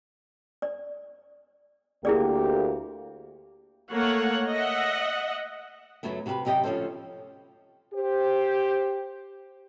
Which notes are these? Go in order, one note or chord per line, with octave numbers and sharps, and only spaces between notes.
D5
D2 A#3 E4 G4 G#4 D5
A3 A#3 C#5 F#5
D#5 E5 F#5
F#2 A2 C#3 F#3 A3 B3
C3 F#4 G4 A4 B4
F#2 C3 G4 D#5 G5
D2 F3 C#4 A4 C5
G4 C5